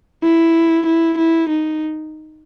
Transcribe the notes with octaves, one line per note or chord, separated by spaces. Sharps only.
E4
E4
E4
D#4